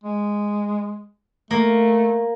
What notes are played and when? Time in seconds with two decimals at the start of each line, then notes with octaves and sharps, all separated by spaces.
0.04 G#3
1.51 A3 A#3